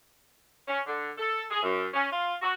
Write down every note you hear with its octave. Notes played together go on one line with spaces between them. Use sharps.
C#4
D3
A4
G#4
F#2
C#4
F4
F#4